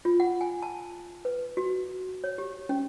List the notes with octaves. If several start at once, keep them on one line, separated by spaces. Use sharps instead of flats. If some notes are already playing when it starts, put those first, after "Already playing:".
F4
F#5
G#5
A5
B4
F#4
C#5
G4
C#4